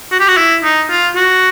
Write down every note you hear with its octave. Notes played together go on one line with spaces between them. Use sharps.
F#4
G4
F#4
E4
D#4
F4
F#4